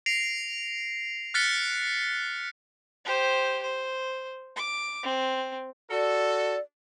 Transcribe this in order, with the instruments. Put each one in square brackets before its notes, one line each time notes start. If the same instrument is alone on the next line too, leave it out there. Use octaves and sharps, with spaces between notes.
[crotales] A#6 C7 D7 F7
F6 F#6 A6 B6 C#7 G7
[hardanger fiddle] G4 C5
C5
D6
C4
[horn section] F#4 A4 [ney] D5